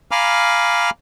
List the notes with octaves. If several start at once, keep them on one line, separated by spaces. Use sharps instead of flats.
F5 G#5 A#5 B5 D6 F6